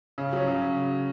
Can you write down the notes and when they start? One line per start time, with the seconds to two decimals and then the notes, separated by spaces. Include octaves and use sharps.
0.18 C#3
0.33 F#3 C#4
0.48 C#3